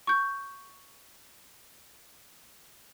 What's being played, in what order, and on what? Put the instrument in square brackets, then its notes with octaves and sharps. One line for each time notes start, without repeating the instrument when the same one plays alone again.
[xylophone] C#6 G6